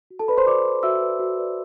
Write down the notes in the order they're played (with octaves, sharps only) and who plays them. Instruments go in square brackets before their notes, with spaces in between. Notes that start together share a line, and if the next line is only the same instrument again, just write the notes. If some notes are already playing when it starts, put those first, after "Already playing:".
[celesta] F#4
A4 A5
B4 D5 B5
C5 C6
F#4 D5 D6
B4 D5
F#4 E5 E6
B4 D5
F#4
B4 D5